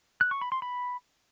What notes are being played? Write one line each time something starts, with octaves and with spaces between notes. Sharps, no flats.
F#6
C#6
B5
C6
B5